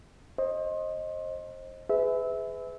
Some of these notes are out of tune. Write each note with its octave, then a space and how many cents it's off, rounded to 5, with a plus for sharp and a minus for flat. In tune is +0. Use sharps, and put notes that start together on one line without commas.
C5 +30 D#5 +0
G#4 +5 B4 +30 E5 -20